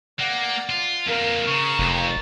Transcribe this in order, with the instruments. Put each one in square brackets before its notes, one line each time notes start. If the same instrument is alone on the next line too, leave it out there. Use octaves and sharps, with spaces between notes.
[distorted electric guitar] A#3 [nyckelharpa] D5 F#5
[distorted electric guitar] F4
[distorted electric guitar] F2 A#3 [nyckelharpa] A#4 F5
[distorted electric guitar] C#3 [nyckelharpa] A#5 C#6
[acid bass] F1 [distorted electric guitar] F2 F3